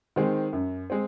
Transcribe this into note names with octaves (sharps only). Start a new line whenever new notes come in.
D#3 G#3 C4
F#2
G#3 C4